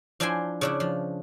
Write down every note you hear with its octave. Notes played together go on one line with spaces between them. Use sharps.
F3 D4 E4 G5 G#5 C6
C#3 D4 E4
F3